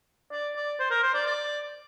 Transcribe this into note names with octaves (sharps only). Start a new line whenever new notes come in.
D5
D5
C5
A#4
C5
D5
D5